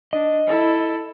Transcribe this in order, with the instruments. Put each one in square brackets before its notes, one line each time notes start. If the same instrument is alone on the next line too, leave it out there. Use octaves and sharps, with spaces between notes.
[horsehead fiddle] D4 [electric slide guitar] D#5
[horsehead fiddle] E4 A4